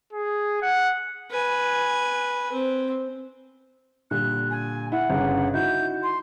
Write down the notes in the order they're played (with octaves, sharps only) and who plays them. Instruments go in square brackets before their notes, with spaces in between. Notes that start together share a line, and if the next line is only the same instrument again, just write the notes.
[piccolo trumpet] G#4
F#5
[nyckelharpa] B4 G#5
C4
[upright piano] A#2 D3 G3 [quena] F#6
[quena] G#5
[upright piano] E4 [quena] F#5
[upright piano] G1 C#3
[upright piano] D#4 E4 F#4 [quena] G6
[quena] C6